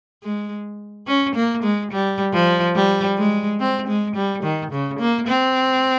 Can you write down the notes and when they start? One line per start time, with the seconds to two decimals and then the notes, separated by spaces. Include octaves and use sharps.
0.23 G#3
1.07 C#4
1.35 A#3
1.63 G#3
1.91 G3
2.34 F3
2.75 G3
3.18 G#3
3.60 C4
3.88 G#3
4.16 G3
4.43 D#3
4.71 C#3
5.00 A#3
5.27 C4